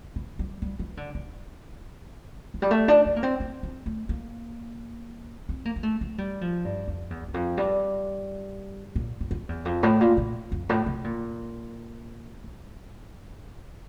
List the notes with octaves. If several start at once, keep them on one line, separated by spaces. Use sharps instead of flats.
E3
G3
G3
E3
D3
E3
F3
G3
A3
D4
D4
A#3
C4
C4
C4
A3
A#3
C4
A#3
A#3
A3
A3
G3
F3
G2
F2
E2
E2
F2
G2
A#2
G2
F2
E2
F2
A2
A#2
A#2
F2
A2
C3
A#2
G2